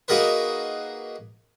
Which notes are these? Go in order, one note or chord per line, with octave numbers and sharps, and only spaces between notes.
A#3 D#4 F#4 G#4 A#4 B4